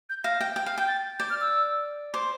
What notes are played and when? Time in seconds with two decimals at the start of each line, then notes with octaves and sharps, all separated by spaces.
0.10 G6
0.24 F5 A#6
0.41 G5
0.56 G5
0.66 F5
0.78 G5 G6
0.88 A6
1.19 D5 G6
1.30 F6
1.41 E6
2.13 C5 D6